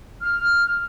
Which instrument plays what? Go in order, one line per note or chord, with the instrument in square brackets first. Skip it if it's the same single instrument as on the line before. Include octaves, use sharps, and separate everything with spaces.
[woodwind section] F6